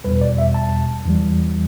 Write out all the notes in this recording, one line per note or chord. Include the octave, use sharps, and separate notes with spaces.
E2 B2 G3 B4
D5
E5
A5
E2 E3 G3